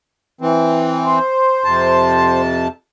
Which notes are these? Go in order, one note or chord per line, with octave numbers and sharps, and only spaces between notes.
E3 C4
C5
F2 C3 A5